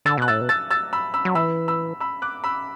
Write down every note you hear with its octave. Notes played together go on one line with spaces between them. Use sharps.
D3 E6 A6
B2 F#6
A2 E6 A6
B2
E6 A6
E6 A6
B5 E6
B5 E6
F#3
E3 B5 E6
B5 E6
B5 E6
D6 F#6
B5 E6